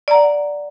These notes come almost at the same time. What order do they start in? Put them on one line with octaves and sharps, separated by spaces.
D5 A#5 F#5